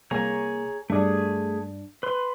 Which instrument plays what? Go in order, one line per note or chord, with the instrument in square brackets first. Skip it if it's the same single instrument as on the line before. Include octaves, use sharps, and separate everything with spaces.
[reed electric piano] C2 A#3 G#5 [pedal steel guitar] G#4 C#5 A#5
[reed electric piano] G2 D4 [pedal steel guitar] A3 G#4
[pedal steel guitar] B4 C6